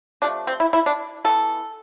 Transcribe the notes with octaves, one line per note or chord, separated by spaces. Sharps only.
C3 F3 A3 D4
C4
E4
E4
D4
E3 B3 A4